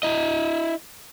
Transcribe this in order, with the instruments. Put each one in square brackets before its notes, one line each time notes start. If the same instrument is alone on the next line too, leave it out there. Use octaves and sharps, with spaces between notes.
[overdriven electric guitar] E4 D#5